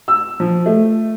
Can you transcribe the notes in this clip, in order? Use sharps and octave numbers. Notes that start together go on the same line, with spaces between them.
E6
F3
A3